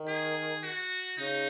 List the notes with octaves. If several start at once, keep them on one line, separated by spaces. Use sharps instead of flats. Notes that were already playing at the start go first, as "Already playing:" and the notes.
Already playing: D#3
G#4
F#4
C#3 D#4